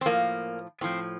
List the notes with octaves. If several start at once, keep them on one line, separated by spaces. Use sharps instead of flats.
C4
A2 F3 A#3
A2 F3 C4